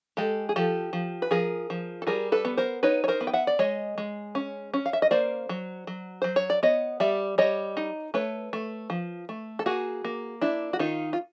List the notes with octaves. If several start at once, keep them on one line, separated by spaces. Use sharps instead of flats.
G#3 G4 A4
G#4
F3 G4 A4
F3
B4
F3 G#4 A#4
F3
A4
G3 G#4 A#4
A4 B4
B3
A#4 C5
D#4 B4 C#5
C#5
A#4 C5
B3
G5
E5 F#5
D5
G#3 C#5 D#5
G#3
C#4
C#4
F5
E5
D#5
A#3 C5 D5
F#3
F#3
F#3 C5
C#5
D5
B3 C#5 D#5
G3 D5 E5
G3 C#5 D#5
D#4
A3 B4 C#5
A3
F3
A3
A4
A#3 F#4 G#4
A#3
D4 E4
F#4
D#3 D#4 F4
F4